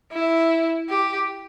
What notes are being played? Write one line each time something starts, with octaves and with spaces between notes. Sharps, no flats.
E4
G4